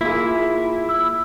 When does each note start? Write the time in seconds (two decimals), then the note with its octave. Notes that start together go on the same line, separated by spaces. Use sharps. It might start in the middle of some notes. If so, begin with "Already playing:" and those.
0.01 A#3 E4 F4 G#4
0.89 E6